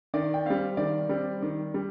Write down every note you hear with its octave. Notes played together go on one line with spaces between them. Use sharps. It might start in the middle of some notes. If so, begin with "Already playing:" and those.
D#3 D5
G5
G3 C4 F5
D#3 D5
G3 C4
D#3
G3